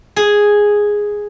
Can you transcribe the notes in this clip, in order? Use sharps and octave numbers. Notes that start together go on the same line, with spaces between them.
G#4